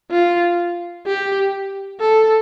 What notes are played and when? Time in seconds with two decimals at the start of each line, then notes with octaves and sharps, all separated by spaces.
0.11 F4
1.06 G4
2.00 A4